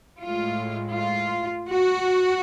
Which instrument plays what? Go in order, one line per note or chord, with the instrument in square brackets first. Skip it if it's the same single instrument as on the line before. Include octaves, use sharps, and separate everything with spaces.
[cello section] A2 G#3 F4
F4
F#4